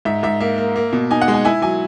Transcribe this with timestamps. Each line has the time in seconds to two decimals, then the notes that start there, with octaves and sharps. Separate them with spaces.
0.05 G#2 E5
0.23 G#2 E5
0.41 A#3 E5
0.58 A#3
0.76 A#3
0.93 B2
1.11 D#4 G#5
1.21 F#5
1.28 G#3
1.34 G#5
1.45 E4 G#5
1.62 F#3 G#5